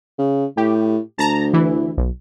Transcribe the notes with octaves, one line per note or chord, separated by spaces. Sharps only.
C#3
A2 G4
D2 A5 A#5
E3 E4
B1